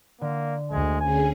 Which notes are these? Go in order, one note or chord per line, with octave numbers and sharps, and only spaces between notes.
D3 A#3
D2 G#3 G#6
D3 C#4 G#4 G#5